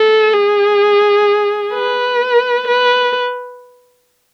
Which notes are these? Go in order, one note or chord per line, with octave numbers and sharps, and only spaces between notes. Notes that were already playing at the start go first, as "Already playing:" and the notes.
Already playing: A4
G#4
B4
B4